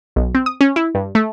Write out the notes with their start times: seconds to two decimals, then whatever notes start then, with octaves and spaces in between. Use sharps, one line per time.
0.16 B1
0.35 C4
0.46 D#6
0.61 C#4
0.76 E4
0.95 G2
1.15 A3